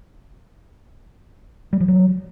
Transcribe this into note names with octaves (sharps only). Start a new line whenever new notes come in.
G3
F3
F#3